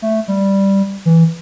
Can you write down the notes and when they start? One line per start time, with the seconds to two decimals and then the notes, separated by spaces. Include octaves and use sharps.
0.02 A3
0.28 G3
1.06 E3